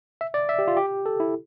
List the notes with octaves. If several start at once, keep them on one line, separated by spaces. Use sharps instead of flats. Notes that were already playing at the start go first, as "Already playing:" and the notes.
E5
D5
E5
G4
F4
G4
A4
E4